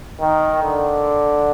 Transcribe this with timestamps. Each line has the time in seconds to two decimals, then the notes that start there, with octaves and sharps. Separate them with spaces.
0.20 D#3
0.63 D3